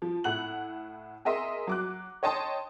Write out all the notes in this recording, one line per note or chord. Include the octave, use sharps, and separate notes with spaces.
F3
A2 E4 F#5 F#6 F#7
G#4 A#4 D#5 E5 C6
F#3 D6 F#6
C#5 D#5 G5 A5 C6 D#6